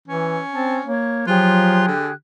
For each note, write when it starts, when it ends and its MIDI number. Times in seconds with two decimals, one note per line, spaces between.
0.08 0.39 52
0.08 0.88 61
0.52 0.79 60
0.52 0.76 81
0.86 1.22 58
0.86 1.25 73
1.27 1.90 53
1.27 1.91 54
1.27 1.86 65
1.27 2.11 67
1.27 2.11 68
1.27 2.11 90
1.87 2.11 50